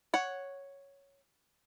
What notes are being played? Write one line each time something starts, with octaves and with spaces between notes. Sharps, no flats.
C#5 F#5